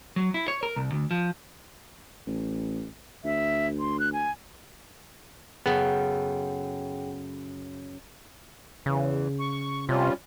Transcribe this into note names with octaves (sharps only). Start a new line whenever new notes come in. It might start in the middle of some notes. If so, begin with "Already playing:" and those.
F#3
E4
C#5
A#4
C2
D2
F3
A1
D2 E5
C6
F#6
G#5
F#2 C#3 B3 G#4 A4 F#5 G5
E2 C#3 E3
C#6
C3 G3 C#4 F4